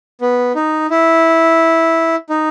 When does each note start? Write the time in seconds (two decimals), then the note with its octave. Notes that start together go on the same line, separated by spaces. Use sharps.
0.21 B3
0.55 D#4
0.90 E4
2.30 D#4